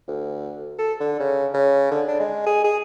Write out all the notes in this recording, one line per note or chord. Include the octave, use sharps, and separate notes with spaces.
D2
A4
D3
C#3
C#3
D3
D4
G#3
G#4
G#4